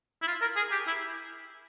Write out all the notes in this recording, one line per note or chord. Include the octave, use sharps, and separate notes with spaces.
E4
F4
A#4
G#4
G4
E4